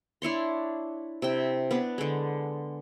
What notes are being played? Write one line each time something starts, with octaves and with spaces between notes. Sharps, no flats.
D4 E4 C#5 C6
C3 E4 G5
B3 D4
D3 G#3